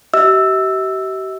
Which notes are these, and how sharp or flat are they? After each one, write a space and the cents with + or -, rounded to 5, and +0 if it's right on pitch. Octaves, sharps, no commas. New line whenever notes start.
G4 -40 E5 -40 E6 +0